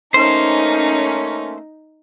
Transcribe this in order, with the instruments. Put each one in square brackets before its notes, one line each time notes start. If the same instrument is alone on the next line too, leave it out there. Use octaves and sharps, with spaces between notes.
[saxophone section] A3 A#3 C#4 [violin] D#4 [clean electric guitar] C5